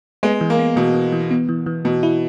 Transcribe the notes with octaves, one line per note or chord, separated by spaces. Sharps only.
G#3 B3
E3
A#3
B3
B2 E3
E3
E3
B3
E3
E3
B2 E3
E4